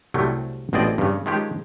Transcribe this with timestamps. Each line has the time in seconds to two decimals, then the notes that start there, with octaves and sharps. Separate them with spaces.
0.14 C2 C3 F#3 G3 A3
0.73 A1 B2 C4 G#4 D5 D#5
0.98 G2 C#3
1.26 D#3 F3 G#3 C#4 G4